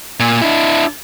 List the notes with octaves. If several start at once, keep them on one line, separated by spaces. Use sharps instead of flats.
A#2
D4 E4